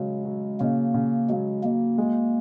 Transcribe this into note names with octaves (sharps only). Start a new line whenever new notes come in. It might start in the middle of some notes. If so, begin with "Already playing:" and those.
Already playing: C#3 F#3 G#3
F#3
C#3 A#3
C#3
F#3 G#3
F#3 A#3
G#3